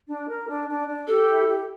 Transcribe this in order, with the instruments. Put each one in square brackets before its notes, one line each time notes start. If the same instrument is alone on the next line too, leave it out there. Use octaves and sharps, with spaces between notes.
[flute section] D4
A#4
D4
D4
D4
[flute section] G4 [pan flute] A4
[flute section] E4
G4